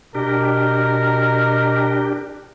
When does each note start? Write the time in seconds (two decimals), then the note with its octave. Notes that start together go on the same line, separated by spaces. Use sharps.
0.15 B2 D4 G4 A#4